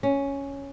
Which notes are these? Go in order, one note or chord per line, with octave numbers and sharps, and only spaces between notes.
C#4